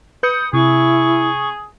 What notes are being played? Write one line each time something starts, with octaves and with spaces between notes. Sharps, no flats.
B4 D#6 G6 C#7
C3 E4 G#4 C#6